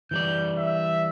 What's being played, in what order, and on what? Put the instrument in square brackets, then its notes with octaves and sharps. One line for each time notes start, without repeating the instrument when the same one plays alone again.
[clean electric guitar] E3 G3 D5 [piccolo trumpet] G6
[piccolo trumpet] E5